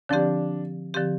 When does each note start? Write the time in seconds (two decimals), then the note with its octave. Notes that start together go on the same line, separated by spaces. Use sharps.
0.09 D3 F3 C4 D4 G4
0.94 D3 F3 C4 G4